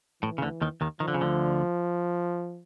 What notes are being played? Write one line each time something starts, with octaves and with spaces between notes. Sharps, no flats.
A2 E3
C#3
D2 D3
D#2 D#3
D#2 D#3
D#3 F3
D3
C#3
D2 D3